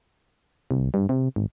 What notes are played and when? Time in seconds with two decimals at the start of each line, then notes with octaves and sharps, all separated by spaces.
0.71 C2
0.94 G2
1.09 C3
1.36 G#1